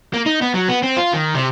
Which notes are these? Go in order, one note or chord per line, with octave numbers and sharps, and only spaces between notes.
A#3
D#4
B3
F#3
B3
C4
F4
D#3
C3